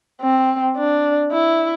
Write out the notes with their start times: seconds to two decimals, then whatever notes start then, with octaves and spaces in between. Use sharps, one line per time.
0.22 C4
0.77 D4
1.32 E4